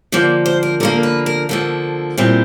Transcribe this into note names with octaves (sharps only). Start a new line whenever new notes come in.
D3 F3 A#3 D5
C5
A#4
D3 F3 A#3 A#4
B4
A#4
D3 F3 A#3 A4
A#2 G3 C4 E4